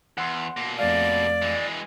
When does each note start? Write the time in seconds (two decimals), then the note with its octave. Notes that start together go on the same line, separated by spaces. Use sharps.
0.18 E2 F#5 C6
0.57 B2 A#3
0.79 F2 A3 D5 F5
1.42 E3 G#3